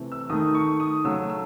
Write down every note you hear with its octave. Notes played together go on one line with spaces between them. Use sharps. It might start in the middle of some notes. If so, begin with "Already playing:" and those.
Already playing: C3 E3 A3
E6
D#3 A3 D#6
C#6
D#6
C#3 F#3 A3 E6
E6